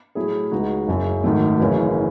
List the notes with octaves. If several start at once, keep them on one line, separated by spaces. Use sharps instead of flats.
A2 F#3 A3 E4 G#4
C#2 C#3 G#3 D#4 F#4
F#1 F#2 C#3
G#1 F#2 D#3 A3
F#1 F#2 C#3 E3